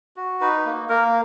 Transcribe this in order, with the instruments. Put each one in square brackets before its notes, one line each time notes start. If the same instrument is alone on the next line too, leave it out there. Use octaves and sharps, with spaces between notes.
[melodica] F#4
D#4 B4
A#3
A#3 A#4